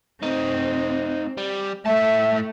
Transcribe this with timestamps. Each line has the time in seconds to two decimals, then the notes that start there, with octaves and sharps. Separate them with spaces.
0.22 A3 C4 D#4
1.37 G3
1.86 A2 A3 E5 A5